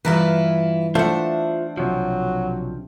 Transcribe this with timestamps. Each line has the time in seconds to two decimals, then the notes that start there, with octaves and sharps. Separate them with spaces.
0.05 G2 E3 E4 F4 A#4 B4
0.95 A3 D4 F4 C5 E5 F#5
1.78 B1 C3 F3 F#3